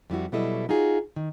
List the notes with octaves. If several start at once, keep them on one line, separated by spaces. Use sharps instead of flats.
F2 G3 E4 F#4
B2 F#3 G3 E4 A4 D#5
D#4 F4 F#4 G#4
D#3